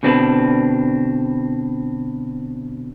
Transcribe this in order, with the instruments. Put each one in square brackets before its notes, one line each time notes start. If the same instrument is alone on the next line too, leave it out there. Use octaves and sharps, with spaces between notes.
[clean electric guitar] B2 D3 C4 D4 G4 B4